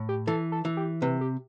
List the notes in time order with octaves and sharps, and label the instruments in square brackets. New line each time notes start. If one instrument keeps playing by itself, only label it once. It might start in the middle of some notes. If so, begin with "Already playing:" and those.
Already playing: [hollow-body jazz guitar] A2
[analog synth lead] G4
[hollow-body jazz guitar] E3 [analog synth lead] A4
[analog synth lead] A4
[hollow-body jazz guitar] E3
[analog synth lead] G4
[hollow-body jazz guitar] C3 [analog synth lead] B4
[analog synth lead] G4